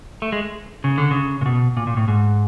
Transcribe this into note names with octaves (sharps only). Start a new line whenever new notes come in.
A3
G#3
C#3
D3
C#3
A#2
B2
A#2
A#2
A2
G#2